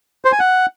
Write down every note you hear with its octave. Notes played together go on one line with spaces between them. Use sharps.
C5
G#5
F#5